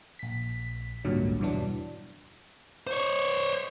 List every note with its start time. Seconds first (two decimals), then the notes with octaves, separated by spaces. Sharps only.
0.19 A#1 B6
1.05 G#1 C#2 G2 A#2 D3 F#3
1.40 E2 G2 B2 E3 F#3 D4
2.87 C5 C#5